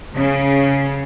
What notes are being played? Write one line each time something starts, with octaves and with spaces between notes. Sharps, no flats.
C#3